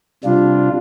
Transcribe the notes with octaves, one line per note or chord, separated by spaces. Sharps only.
C3 G3 D4 F4